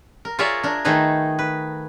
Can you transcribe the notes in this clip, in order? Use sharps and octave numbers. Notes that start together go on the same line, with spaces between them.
A#4
F4 G#4 A#4 C#5 D5 E5
D4 A#4
D#3 A3 D#4 G#4 B4
B4